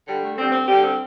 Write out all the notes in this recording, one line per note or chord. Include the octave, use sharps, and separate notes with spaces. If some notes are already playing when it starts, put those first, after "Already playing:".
D3 G3
A3
D3 G3 C4
C4
D3 G3 G4
C4